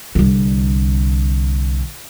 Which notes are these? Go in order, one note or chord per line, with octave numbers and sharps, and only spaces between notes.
C2 D3